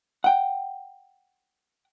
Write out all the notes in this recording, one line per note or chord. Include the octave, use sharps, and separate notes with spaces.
F#5 G5